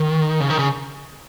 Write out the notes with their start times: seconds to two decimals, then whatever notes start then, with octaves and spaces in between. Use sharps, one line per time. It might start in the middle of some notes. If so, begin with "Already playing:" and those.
Already playing: D#3
0.40 C#3
0.50 D#3
0.59 C#3